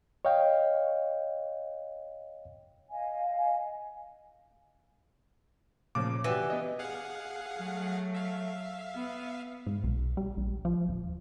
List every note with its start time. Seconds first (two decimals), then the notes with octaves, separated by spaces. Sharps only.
0.25 C#5 D#5 F5 G5
2.91 D#5 F5 G#5
5.95 A#2 C#3 F3 D6
6.24 E3 D4 F#4 G4
6.50 B3 D#5
6.79 G#4 F5 F#5
7.58 F#3 A3
8.14 E5 F5
8.95 B3
9.67 G#2
9.84 B1
10.17 G3
10.37 A#1
10.65 F3
10.88 D#1